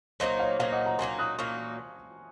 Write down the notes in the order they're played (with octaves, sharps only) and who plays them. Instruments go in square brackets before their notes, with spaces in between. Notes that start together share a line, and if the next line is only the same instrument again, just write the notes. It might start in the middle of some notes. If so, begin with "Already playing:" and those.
[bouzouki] A#2 F#3 A#3 D#4 [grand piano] C5 D#5
[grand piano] C#5 F5
[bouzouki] A#2 F#3 A#3 D#4 [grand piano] C#5 F5
[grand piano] D#5 F#5
F#5 A#5
[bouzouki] A#2 F#3 A#3 D#4 [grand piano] G#5 C6
[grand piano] D#6 F#6
[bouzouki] A#2 F#3 A#3 D#4 [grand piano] C#6 F6